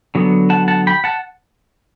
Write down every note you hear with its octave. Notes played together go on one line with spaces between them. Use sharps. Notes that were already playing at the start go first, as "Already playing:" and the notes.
D3 F#3 B3
F#5 A5
F#5 A5
G5 B5
F#5 A5